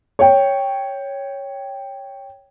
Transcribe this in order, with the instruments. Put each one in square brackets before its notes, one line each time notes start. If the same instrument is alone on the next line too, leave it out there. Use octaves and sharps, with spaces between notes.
[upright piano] C#5 G5